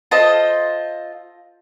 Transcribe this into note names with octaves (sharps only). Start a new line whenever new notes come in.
F4 A4 C5 D#5